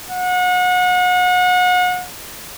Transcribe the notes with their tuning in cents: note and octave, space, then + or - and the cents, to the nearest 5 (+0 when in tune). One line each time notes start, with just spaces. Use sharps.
F#5 -35